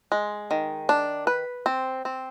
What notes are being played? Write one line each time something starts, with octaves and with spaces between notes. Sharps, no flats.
G#3
D#3
D4
B4
C4
C4